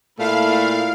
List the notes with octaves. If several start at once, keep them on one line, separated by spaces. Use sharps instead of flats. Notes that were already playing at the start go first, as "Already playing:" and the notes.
A#2 A3 E4 F5